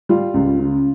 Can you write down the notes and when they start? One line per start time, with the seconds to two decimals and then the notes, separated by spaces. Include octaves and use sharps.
0.09 G3 F4
0.34 C#2
0.59 C#3